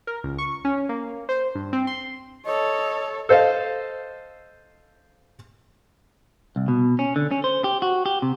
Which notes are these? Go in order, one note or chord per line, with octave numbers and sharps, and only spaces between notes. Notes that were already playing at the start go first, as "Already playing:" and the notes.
A#4
C#2
C#6
C#4
A#3
C5
G2
C4
C6
A4 C#5 D#5
A4 C5 D#5 F5
C2
B2
C#4
D3
C#4
C5
G4
F#4
G4
C3